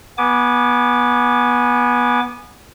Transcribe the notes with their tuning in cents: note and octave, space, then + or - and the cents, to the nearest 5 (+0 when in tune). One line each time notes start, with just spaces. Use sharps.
B3 -20 G#5 +0 D6 -15